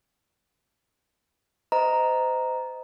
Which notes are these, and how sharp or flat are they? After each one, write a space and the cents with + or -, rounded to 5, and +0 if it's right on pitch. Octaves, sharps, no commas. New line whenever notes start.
C5 -35 D#5 +10 A#5 +0